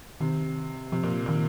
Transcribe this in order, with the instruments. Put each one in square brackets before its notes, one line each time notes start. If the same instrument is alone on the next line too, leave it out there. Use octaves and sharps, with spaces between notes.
[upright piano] C3 [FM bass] D#3
[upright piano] C3 [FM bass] F3
[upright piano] A#2
[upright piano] A#2 [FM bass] D#3